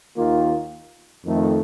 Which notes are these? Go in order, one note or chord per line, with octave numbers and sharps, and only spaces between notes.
D#2 D#3 A#3 F4
F2 D#3 A3